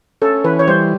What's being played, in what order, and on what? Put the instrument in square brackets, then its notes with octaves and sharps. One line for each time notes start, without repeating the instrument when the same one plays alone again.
[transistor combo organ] C#4 [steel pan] A4
[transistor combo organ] E3 [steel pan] B4
[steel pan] C#5
[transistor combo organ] G3 [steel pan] C5